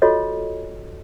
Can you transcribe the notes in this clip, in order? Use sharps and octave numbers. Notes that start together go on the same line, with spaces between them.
F4 F#4 A4 C#5 D#5